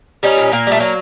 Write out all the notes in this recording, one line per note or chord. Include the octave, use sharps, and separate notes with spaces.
G3 C#4 D#4
A#2
A#2 A#3
G3 A3
F#3 A#3